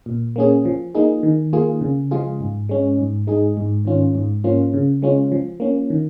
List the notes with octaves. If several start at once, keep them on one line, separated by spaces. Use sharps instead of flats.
A#2
A#3 C#4 G#4
F3
A#3 D#4 G#4
D#3
A#3 F4 G#4
C#3
F3 G#3 F4 G#4
G#2
G#3 C#4
G#2
G#3 D#4 G#4
G#2
D#3 C#4 F4
G#2
F3 A#3 C#4 F4
C#3
G#3 C#4 F4
F3
A#3 C#4
D#3